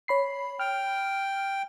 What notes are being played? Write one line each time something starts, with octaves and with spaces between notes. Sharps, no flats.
C#5 B5 C7
G5 F6